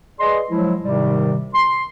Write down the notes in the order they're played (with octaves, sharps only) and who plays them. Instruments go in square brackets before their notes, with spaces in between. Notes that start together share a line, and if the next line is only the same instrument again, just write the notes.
[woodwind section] G#4 B4 D5 D#5 C6
F3 F#3 G#3 E4
G#2 C3 D#3 G3
C6